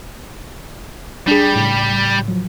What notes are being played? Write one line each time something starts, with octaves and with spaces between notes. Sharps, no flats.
G3 D4 G#4
A2 C#3
F3 F#3